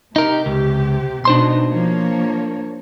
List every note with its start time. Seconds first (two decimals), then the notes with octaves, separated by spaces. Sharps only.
0.16 C3 D#4 G4 A#4
0.46 C#2
1.25 B2 D4 D#4 C5 C6
1.70 F3 A#3 C#5